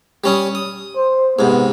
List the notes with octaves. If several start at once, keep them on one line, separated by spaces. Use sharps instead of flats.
G3 C#4 D#6
D#6
C5
G#2 C3 B3